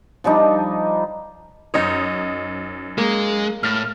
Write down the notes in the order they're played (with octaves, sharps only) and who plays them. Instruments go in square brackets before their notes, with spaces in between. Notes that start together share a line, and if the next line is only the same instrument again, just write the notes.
[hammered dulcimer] F3 G3 D4 D#4
[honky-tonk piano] F#2 D#5 D#6 [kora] D#4 C5 C#5
[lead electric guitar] G#3 [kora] A#3
[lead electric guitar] A2 [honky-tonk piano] F6 A6